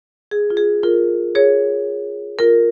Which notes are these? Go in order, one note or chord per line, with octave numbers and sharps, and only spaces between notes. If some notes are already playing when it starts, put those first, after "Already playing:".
G#4
F4
G#4
F4 A#4
G#4 C#5
F4 A#4